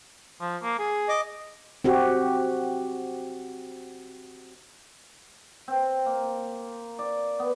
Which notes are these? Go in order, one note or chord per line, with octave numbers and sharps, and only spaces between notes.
F3
A#3
G#4
D#5 D6
C4 F#4 G4
C4
A#3
D5
B3